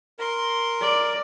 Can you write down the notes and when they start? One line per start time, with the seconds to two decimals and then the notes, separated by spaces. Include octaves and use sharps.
0.19 A#4 C6
0.81 D5